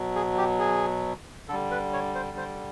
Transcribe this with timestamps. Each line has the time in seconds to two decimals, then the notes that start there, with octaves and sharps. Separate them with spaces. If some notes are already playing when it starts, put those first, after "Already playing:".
Already playing: B2 F#3
0.16 G#4
0.38 G4
0.59 G#4
1.48 D3 A4
1.52 G3
1.71 B4
1.93 C#5
2.15 C5
2.37 C5